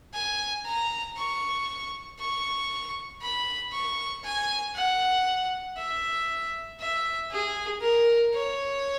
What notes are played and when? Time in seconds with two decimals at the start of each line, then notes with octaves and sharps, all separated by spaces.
0.13 G#5
0.65 A#5
1.17 C#6
2.19 C#6
3.21 B5
3.72 C#6
4.24 G#5
4.75 F#5
5.77 E5
6.80 E5
7.31 G#4
7.81 A#4
8.33 C#5